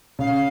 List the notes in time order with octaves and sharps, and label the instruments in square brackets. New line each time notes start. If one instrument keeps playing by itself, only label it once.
[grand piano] C#3 [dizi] F5